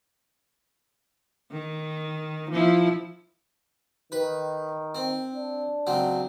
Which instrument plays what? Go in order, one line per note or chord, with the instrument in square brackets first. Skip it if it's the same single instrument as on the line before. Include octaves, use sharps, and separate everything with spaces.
[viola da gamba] D#3
F3 E4
[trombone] D#3 [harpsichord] B4
[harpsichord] C4
[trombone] D4
[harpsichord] C#2 F#3 C4